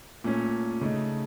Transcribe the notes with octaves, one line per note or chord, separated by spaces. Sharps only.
A#2 A3 C#4
C#3 A3 D#4